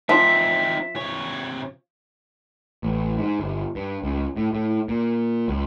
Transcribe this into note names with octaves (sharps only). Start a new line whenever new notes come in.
F3 C4 D#4 E5
C3 C#5
A1
G#2
G1
G2
C#2
A2
A2
A#2
C#2